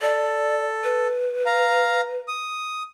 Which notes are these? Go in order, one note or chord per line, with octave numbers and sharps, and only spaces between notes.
A4 D5
B4
F5 A#5
D#6